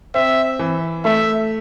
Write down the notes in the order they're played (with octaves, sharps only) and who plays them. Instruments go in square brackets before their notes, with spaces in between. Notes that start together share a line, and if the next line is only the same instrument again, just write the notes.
[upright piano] C4 [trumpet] E5
[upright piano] E3
[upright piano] A3 [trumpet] E5